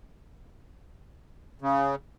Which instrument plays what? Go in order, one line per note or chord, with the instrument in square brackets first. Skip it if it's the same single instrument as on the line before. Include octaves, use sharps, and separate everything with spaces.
[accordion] C#3